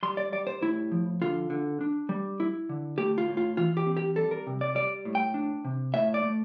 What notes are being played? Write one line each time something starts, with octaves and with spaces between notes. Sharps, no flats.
G3 C6
D5
G3 D5
C5
A2 E4
F3
D3 F4
D3
D4
G3
E4
D3
A3 G4
F4
A2
F4
E3 F4
G4
C4
G4
G3 A4
A#4
C3
D5
G3 D5
A2
G5
D4
C3
A2 E5
D5
A3